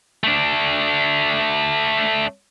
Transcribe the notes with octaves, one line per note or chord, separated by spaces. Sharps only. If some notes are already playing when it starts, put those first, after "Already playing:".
A3 D4